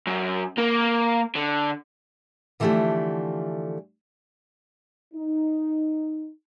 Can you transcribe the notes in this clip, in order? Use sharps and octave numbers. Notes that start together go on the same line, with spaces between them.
F#2
A#3
D3
D3 E3 F3 A3 G4 D5
D#4